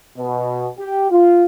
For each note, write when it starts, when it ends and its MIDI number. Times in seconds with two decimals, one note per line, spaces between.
0.17 0.68 47
0.78 1.06 67
1.10 1.45 65